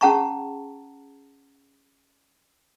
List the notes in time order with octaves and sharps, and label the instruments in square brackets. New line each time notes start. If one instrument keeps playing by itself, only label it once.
[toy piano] C#4 G#4 F#5 A5 A#5 C#6